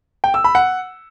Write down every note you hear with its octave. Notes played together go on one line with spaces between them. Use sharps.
G5
E6
B5
F#5